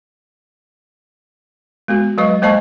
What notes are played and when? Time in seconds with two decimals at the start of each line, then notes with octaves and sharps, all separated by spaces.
1.88 G#3 B3 F#4
2.18 F#3 G#3 B4 D#5 C#6
2.42 G#3 A#3 C5 D#5 A5 C#6